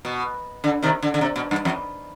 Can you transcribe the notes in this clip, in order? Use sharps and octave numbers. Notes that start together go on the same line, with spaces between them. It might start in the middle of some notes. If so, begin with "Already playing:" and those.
B2
D3
C3 D#3
D3
D3
C3
B2
G2
F2